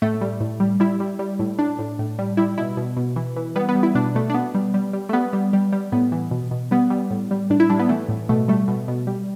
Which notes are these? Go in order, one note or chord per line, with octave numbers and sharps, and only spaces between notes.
A2 A3
G3
A2
G3
G3 E4
G3
G3
A2
A2 D4
A2
A2
G3
G3 E4
B2 E4
B2
B2
E3
E3
G3 B3
B3
G3
E4
B2 D4
B2 A3
D4
B2 B3
G3
G3
G3
A3
G3 B3
G3
G3
G3
A2 B3
E3
B2
B2
G3 B3
G3
A2
G3
A2 D4
E4
G3 D4
B3
E3 A3
A2
B2 A3
G3 A3
B2
B2
G3